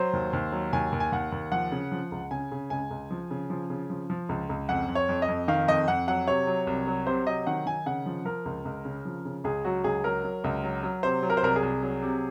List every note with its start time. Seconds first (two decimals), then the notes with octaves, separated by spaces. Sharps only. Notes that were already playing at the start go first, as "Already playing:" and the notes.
Already playing: F#3 C5
0.13 D#2
0.33 D#2
0.52 F#3
0.73 D#2 G#5
0.92 D#2
1.00 G#5
1.12 D#2 F#5
1.32 D#2
1.52 F3 F#5
1.72 C#3
1.92 F3
2.12 C#2
2.31 C#3 G#5
2.52 C#3
2.70 C#2 G#5
2.91 C#2
3.11 F3
3.31 C#3
3.50 F3
3.70 C#3
3.90 F3
4.10 F3
4.29 C#2
4.49 C#2
4.69 F2 F#5
4.88 F2
4.95 C#5
5.09 F2
5.22 D#5
5.28 F2
5.48 D#3 F5
5.68 F2 D#5
5.88 F2 F#5
6.08 F#3 F#5
6.28 C3 C#5
6.47 F#3
6.67 C2
6.87 F#3
7.07 C3 C5
7.26 F#3 D#5
7.47 D#3 F#5
7.66 D#3 G#5
7.86 C#3 F#5
8.06 F3
8.25 F3 A#4
8.45 C#2
8.65 C#2
8.85 C#3
9.05 F3
9.25 C#3
9.44 C#2 G#4
9.64 F#3 F#4
9.84 C#2 G#4
10.04 F#3 A#4
10.24 F#3
10.44 C#2
10.64 F#3
10.83 F#3
11.03 C3 C5
11.23 F#3
11.30 A#4
11.37 C5
11.43 C2 A#4
11.56 G#4
11.63 C2
11.83 F#3
12.02 C3